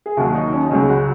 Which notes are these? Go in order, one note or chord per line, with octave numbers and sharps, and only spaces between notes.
G#4
D#2 D#3 F#3 F#4
F#4
D#4
C#4
D#4
C#2 C#3 F#3 C#4
F#4